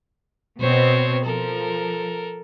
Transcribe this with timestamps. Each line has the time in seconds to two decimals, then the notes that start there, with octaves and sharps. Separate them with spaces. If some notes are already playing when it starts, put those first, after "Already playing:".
0.60 B2 C4 C5 C#5
1.25 F3 A4 A#4